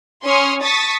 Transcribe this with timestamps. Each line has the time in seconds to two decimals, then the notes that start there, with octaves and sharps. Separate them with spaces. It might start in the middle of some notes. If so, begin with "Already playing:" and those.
0.23 C#4 C6 C#6 D#6 F6
0.63 A5 C#6 D#6 A6 B6